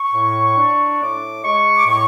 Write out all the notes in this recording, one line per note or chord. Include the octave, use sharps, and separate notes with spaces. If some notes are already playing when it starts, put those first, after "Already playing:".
Already playing: C#6
A2
D4
A2 D6
G#3 C#6
D6
A2 C#6